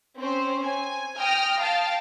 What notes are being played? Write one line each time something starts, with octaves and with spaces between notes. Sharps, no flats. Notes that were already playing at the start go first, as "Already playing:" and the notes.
C4 C#4 C5
G#5
G5 D#6 F6 A#6
F5 G5 A5 A6